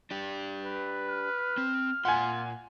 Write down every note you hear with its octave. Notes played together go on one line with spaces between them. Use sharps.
D4 G4
B4
F6
C4
A#2 F4 F#5 G#5 C6